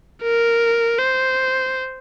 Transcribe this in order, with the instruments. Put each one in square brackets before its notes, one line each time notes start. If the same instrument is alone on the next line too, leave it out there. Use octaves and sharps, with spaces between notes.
[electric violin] A#4
C5